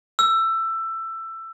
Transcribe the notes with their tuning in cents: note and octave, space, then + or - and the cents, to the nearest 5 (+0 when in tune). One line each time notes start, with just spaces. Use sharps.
E6 +15